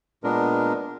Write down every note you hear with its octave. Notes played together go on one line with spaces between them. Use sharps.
A#2 G#3 B3 D4 A#4